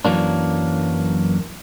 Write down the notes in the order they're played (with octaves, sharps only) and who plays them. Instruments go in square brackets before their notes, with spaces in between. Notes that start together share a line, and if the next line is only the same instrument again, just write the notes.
[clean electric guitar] F#2 E3 F#3 A#3 D4